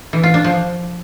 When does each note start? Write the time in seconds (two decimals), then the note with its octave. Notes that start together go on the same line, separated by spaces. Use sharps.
0.13 E3
0.23 F4
0.34 D4
0.44 F3